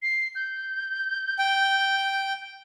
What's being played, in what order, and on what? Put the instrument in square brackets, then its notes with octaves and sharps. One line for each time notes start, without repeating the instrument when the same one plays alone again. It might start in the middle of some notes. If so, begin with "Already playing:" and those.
[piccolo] C7
G6
[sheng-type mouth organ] G5